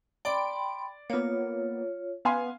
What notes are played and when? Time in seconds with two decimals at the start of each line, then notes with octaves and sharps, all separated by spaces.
0.25 D5 G5 B5 C6 D7
1.10 A#3 B3 F4 C#5
2.25 B3 F5 G#5 C6